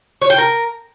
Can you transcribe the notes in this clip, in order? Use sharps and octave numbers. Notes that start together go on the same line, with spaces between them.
C#5
G5
A#4